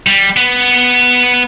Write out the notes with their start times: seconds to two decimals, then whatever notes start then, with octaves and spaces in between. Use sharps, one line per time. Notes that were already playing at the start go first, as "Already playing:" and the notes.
0.07 G3
0.37 B3